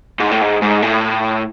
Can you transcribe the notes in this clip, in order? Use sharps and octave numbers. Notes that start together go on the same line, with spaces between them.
G#2
A2
G#2
G#2
A2